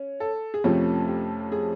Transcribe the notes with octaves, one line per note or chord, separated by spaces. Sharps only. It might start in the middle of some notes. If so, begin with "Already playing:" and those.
Already playing: C#4
A4
G#4
F2 C3 F3 A3 C#4 G4
G4
G#4